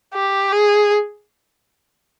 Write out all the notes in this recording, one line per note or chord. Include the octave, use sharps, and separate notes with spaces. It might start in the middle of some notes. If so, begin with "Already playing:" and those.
G4
G#4